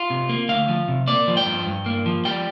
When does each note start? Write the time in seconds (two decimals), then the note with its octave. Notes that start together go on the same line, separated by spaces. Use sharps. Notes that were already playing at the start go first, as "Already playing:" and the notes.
Already playing: F4
0.10 C3
0.29 A#3
0.49 D2 F5
0.68 F3
0.88 C3
1.08 A#3 D5
1.28 F3
1.37 G5
1.46 G2
1.66 G2
1.86 A#3
2.06 F3
2.25 G3 G5